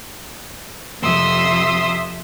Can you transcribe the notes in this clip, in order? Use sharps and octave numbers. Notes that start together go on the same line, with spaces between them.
F2 C3 E5 C6 D#6 E6